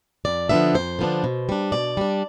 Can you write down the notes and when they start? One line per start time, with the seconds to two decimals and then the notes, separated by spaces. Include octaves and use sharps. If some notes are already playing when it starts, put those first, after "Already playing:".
0.25 F2 D5
0.49 D3 F3 B3 D4 E5
0.74 F2 C5
0.99 D3 F3 B3 D4
1.24 B2
1.49 G3 D4
1.72 B2 D5
1.97 G3 D4